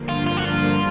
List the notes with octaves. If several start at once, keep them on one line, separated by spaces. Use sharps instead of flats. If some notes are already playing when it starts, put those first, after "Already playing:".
Already playing: G2 D3 F3 A#3
F4
F4
F#4
F4